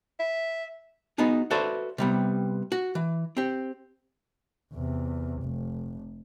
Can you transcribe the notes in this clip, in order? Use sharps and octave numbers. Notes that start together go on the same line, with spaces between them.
E5
B3 D#4 F#4 G#4
F#4 A4 B4 C5 D5 E5
C3 G3 B3
F#4
E3
C4 G4
E2 C3
F1